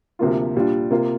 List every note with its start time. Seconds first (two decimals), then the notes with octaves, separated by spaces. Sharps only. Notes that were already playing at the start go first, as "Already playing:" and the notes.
0.19 D2 C3 F3 A#3 F4
0.55 A#2 G3 D4 F4
0.91 C3 A#3 F4